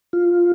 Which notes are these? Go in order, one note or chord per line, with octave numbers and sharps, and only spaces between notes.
F4